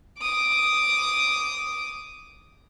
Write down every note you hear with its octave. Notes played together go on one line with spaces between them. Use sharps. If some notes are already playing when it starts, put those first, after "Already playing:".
D6 D#6